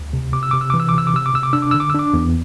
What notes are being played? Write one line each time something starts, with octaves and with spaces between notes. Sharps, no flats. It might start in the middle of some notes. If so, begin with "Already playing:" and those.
Already playing: D2
C3
C3 D6
E6
C3 D6
E6
E3 D6
E6
D6
C3 E6
D6
C3 E6
D6
C3 E6
D6
D4 E6
D6
D3 E6
D6
E6
D4 D6
E2